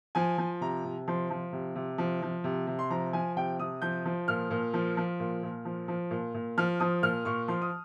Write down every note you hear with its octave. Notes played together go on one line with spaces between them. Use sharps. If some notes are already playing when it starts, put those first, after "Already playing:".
F3 G#5
F3
C3 A#5
C3
F3 C6
F3
C3
C3
F3
F3
C3
C3
C6
F3 A#5
F3 G#5
C3 G5
C3 D#6
F3 G6
F3
A#2 F6
A#2
F3
F3
A#2
A#2
F3
F3
A#2
A#2
F3 F6
F3 D#6
A#2 F6
A#2 C#6
F3 C6
D#6